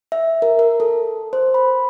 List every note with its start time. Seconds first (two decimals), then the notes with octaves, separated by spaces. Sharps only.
0.12 E5
0.42 A#4
0.59 A#4
0.80 A4
1.33 C5
1.54 B5